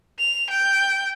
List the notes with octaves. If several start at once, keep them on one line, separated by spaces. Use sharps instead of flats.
F7
G5